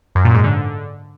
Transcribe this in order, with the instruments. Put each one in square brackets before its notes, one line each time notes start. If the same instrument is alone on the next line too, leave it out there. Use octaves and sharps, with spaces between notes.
[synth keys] F#2
A#2
G#2
D3